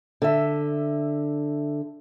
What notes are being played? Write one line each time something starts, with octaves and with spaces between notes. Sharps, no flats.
D3 E5